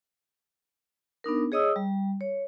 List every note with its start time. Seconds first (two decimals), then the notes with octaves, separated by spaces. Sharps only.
1.24 B3 D4 D#4 A#4
1.52 G#4 C#5 D#5 D#6 E6
1.76 G3
2.21 C#5